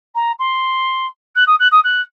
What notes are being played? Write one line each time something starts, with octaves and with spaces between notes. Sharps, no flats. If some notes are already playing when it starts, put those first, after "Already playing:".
A#5
C6
F#6
D#6
F#6
D#6
F#6